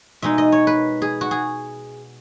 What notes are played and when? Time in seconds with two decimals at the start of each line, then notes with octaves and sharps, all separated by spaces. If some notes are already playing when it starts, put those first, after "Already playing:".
0.22 B2 G#3 D#4 E5
0.38 D#5
0.52 C#5
0.67 B4
1.02 G#4
1.21 F#4
1.31 G#4